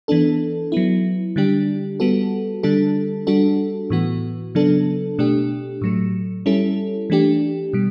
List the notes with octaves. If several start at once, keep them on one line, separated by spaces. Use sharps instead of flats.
E3 B3 D4 A4
F#3 B3 E4
D3 G3 D4 G4
G3 B3 F#4 A4
D3 G3 D4 A4
G3 D4 F#4 A4
A2 E3 B3 F#4
C#3 F#3 B3 D4 A4
B2 A3 D4 G4
A2 F#3 A3
G3 C#4 E4 A4
E3 A3 D4 G4
B2 G3